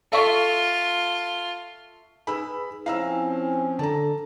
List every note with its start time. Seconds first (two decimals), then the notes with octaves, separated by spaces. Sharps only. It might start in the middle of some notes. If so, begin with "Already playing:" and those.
0.12 F4 A4 E5 C#6
2.27 D#4 G#4 B4 B5 E6
2.86 F3 C4 C#4 E4 F5 A#5 E6
3.79 D3 D4 A4 A5 A#5